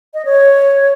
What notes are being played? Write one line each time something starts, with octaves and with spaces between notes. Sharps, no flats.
D#5
C#5